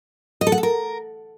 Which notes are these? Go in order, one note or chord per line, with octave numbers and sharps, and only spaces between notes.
D#5
A4
F#5
A4
A#4